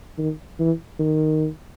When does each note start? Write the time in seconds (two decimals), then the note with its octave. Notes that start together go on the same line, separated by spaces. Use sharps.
0.18 D#3
0.59 E3
0.99 D#3